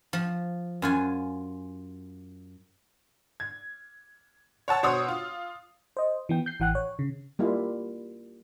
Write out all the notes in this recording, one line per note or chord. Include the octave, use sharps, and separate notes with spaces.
F3
F#2 F4 G#5
G#6
C#5 F#5 A5 E6
B2 C5 C#5 F#5 D#6 E6
F4
C5 D#5
E3 B3 G5
G6 C7
A1 E3 F#5 G5 F#6
C#5
C#3
G3 A#3 E4 F4